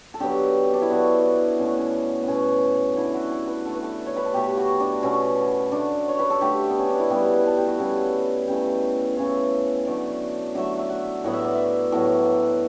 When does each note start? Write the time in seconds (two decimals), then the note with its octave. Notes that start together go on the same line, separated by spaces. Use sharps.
0.14 A4
0.20 D3 F#3 B3 G4
0.73 D4
0.81 E4
0.90 D3 F#3 B3 F#4
1.25 E4
1.59 B2 A3 C#4
1.69 D4
1.78 C#4
2.22 B3
2.27 B2 A3 C#4
2.96 D3 A3 E4
3.14 F#4
3.31 A4
3.48 B4
3.66 D3 A3 A4
3.74 B4
3.83 A4
4.06 C#5
4.16 B4
4.25 A4
4.34 B2 A3 G4
4.57 F#4
4.80 D4
5.03 B2 A3 C#4
5.72 D3 A3 D4
6.08 C#5
6.19 B4
6.30 A4
6.41 D3 A3 G4
6.69 B3
6.79 C#4
6.90 D4
6.99 E4
7.10 C#3 G3 B3 F#4
7.36 B4
7.47 A4
7.57 G4
7.68 F#4
7.79 C#3 G3 B3 E4
8.47 C#3 E3 A3 G4
9.16 C#3 E3 A3 C#5
9.86 D3 F#3 A3 D5
10.55 D3 F#3 A3 E5
10.79 E5
10.90 F#5
11.24 A2 F#3 B3 F#5
11.33 E5
11.44 D5
11.55 E5
11.92 A2 F#3 B3 A4